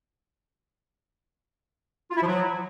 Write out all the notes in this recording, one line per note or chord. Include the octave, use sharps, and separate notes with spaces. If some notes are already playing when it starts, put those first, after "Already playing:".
F4
E4
F3
F#3